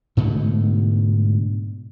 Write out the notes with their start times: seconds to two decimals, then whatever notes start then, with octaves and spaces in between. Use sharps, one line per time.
0.17 G#2 B2 D3 A3